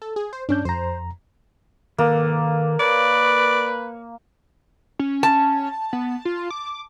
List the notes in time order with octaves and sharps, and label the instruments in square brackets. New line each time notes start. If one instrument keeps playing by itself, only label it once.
[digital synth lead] A4
G#4
C5
[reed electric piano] G2 C#4 G6 [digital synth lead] D4
[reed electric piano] F2 A#5 [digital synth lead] C5
[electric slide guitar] D#3 A4 B4 [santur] A#3
[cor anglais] B4 [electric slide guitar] C#5 [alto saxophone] D5
[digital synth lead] C#4
[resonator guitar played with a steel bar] A5
[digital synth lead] B3
F4
D6